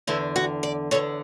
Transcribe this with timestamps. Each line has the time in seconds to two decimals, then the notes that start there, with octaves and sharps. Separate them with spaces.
0.07 E2 D3 E4
0.36 F#4
0.63 D5
0.91 E2 D3 C#5